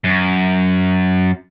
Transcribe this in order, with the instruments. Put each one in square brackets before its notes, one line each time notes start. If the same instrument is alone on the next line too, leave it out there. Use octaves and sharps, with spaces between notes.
[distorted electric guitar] F#2